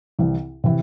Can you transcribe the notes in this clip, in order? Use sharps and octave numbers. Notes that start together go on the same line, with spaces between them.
C2 C3 E3
C3 E3